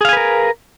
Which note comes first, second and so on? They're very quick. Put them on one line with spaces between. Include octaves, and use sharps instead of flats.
G#4 F5 G#5 B4 A#4